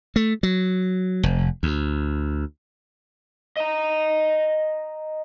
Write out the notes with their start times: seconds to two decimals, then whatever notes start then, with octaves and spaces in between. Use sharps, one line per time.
0.16 A3
0.43 F#3
1.23 F1
1.63 D2
3.57 D#5 A#5